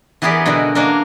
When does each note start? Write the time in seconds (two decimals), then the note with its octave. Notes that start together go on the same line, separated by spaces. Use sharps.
0.22 E3 B3 G4 G#4 A#4 D5
0.46 B2 D3 G#3 F#4 A#4
0.75 A#3 C#4 D4 A#4